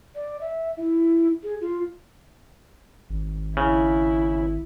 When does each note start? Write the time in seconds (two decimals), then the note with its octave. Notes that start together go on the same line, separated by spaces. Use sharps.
0.15 D5
0.41 E5
0.77 E4
1.43 G#4
1.61 F4
3.10 G#1
3.57 C#3 E4